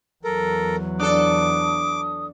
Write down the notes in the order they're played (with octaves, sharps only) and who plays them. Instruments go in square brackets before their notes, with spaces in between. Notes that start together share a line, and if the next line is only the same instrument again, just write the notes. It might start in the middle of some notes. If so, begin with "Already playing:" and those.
[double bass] E2 F#3 [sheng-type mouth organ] A4 A#4
[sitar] D4 A4 [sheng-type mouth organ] D6 [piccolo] D#6